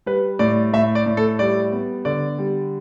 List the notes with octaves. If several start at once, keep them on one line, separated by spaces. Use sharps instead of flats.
G3 B4
A2 D5
A2 E5
D5
A2
A4
G3 D5
B3
D3 D5
G3